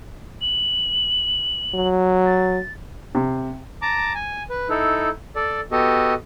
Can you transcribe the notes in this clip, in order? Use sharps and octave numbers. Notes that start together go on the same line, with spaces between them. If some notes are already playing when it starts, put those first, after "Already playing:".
F#7
F#3
A6
C3
A5 A#5 D6
G#5
B4
D#4 E4 A4
A4 D5
B3 F#4 G4 A4 D#5